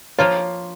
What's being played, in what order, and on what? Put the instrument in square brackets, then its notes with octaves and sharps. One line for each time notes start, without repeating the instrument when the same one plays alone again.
[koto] F3 A#3 F4 [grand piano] C#5